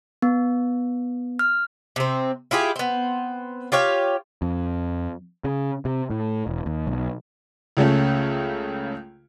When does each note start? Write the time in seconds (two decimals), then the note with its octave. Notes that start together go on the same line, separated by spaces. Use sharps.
0.22 B3
1.39 F6
1.96 C3 C4
2.51 E4 F4 G4 G#4
2.76 B3 C4
3.72 F4 G4 C#5 F5
4.42 F2
5.44 C#3
5.85 C3
6.10 A2
6.47 E1
6.66 D#2
6.87 B1
7.77 C#2 C#3 A3 C#4